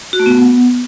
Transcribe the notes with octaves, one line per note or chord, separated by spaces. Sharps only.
F#4
A3
B3